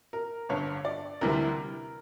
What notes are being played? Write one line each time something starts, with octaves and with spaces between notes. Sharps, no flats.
A#4
G1 G2 D3 C#5
D5
D2 C3 E3 G3 A#4